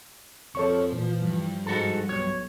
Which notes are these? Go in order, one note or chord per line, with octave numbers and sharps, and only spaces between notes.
F2 F3 A4 C#5 C#6
A#2 E3
G2 F3
G#2 F#4 A4
B1 C#5